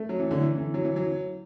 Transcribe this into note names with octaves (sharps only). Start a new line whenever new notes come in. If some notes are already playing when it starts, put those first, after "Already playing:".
Already playing: A3
F#3
E3
D3
E3
E3
F#3
E3
F#3